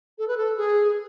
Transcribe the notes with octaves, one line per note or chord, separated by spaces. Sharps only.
A4
B4
A4
G#4